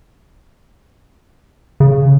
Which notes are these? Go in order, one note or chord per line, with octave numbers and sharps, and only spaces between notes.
C#3